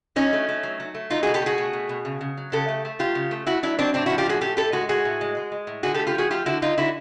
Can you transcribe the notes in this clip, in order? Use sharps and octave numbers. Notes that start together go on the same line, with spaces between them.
F#3 C#4 D#4
A3
A3
F#3
F#3
A3
F#3 D#4 F4
F#4 G#4
B2
G4 A4
A3 F#4 G#4
A3
B2
B2
C#3
C#3
F#3
C#3 G4 A4
A3
A3
F#3 F4 G4
C#3
A3
A3 E4 F#4
F#3 D4 E4
F#3 C4 D4
A2 C4 D4
E4 F#4
F3
F4 G4
A2 F#4 G#4
A2 G4 A4
A2 G4 A4
G#3 F#4 G#4
A2 F#4 G#4
A2
G#3
G#3
G#3
A2
D3 F#4 G#4
G4 A4
A3
F4 G4
F3 F#4 G#4
A3 F4 G4
D3 E4 F#4
D3 D#4 F4
D3 E4 F#4